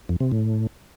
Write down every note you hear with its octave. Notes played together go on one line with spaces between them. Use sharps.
F2
C3
A2